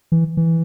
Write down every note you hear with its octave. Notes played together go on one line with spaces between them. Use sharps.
E3
E3